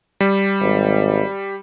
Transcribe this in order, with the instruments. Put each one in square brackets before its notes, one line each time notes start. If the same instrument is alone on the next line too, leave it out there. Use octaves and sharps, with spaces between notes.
[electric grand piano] G3
[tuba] G#1